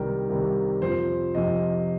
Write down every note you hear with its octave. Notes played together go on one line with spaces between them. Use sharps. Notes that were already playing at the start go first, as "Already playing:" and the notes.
Already playing: C2 C3 D#3 G3 A#4
C2 C3 D#3 G3
F2 C3 F3 C5
F2 C3 F3 D#5